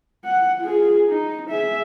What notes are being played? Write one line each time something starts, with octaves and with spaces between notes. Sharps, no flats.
F#5
F4 G#4
D#4
G#4 E5